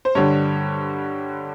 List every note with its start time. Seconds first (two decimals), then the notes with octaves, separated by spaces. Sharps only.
0.05 C5
0.15 G2 D3 G3 C#5